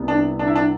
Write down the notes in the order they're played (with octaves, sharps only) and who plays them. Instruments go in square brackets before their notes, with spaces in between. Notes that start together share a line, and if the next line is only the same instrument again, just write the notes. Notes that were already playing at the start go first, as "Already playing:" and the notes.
Already playing: [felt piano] C2 C3 B3
[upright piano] D4
D4
E4
D4